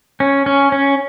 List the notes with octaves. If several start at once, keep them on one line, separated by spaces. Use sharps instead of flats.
C#4
C#4
C#4